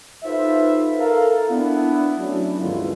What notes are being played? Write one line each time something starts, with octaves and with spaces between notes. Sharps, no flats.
D#4 F4 A4 B4 C5 E5
A4 A#4 F5
B3 D4 E4
F#3 A3 B3 C#4 D4 E4
G1 C#2 D#3 E3 G#3 F4